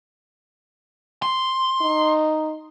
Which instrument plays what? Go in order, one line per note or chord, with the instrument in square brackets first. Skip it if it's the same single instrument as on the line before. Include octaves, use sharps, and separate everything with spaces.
[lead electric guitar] C6
[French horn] D#4